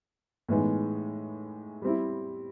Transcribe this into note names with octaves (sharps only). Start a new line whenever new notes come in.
A2 E3 G#3 B3 D#4
G3 C4 E4